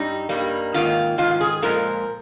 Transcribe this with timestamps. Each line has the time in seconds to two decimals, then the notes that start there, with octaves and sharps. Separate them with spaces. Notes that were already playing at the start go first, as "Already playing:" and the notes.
Already playing: G2 G3 D#4
0.29 G2 G3 A#3
0.74 G#2 D#3 A#3 F4
1.18 G#2 D#3 F4
1.41 G#4
1.62 A#2 F3 G#3 A#4